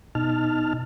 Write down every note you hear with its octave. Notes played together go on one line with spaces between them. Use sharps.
B2 D#4 A5 F6